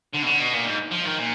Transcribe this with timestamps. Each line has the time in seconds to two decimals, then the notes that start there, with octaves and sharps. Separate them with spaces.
0.13 D3
0.22 B2
0.26 D3
0.40 B2
0.53 A#2
0.66 G#2
0.92 F3
1.05 D#3
1.18 A#2